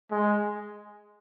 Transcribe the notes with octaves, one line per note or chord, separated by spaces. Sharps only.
G#3